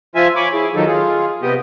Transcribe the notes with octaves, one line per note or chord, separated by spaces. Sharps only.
F3 F4 E5 G#5
C#5 G#5 B5 D6
E4 G#4
D#3 F3 F#3 D#4 A4
F4 G#4
C3 B3 G4 D#5